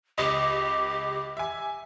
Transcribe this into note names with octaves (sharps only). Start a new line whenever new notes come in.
C#2 G4 D#5
E5 G#5